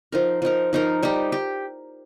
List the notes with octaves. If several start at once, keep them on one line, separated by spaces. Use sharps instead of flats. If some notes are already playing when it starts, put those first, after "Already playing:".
F3 D#4 A#4
F3 D#4 A#4
F3 D#4 A#4
G3 D#4 G4
G4